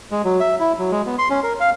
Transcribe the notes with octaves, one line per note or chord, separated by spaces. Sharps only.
G#3
F#3
E5
E4
F#3
G#3
B3
C6
C#4
A#4
F5